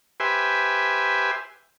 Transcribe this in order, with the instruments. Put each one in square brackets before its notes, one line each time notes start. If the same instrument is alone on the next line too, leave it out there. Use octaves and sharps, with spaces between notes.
[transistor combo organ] G4 B4 C5 E5 G#5